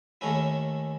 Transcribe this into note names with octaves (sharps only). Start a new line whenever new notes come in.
D#2 D#3 A3 C#4 E4